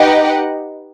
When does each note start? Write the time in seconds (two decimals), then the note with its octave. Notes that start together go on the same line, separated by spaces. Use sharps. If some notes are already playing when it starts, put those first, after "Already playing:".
Already playing: D#4 G4 B4 D#5 F#5